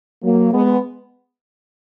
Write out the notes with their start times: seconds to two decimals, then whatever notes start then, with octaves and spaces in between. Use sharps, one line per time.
0.22 F#3 A#3
0.52 G#3 B3